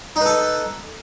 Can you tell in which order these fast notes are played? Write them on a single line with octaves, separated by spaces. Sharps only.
D#4 B4 A4